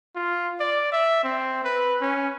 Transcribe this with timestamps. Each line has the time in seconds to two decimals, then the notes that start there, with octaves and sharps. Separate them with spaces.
0.16 F4
0.60 D5
0.92 E5
1.24 C4
1.65 B4
2.01 C#4